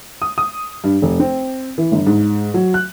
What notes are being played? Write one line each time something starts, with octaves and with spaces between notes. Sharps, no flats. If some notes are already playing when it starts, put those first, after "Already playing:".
D#6
D#6
G2
F1
C4
E3
G1
G#2
F#3
F#6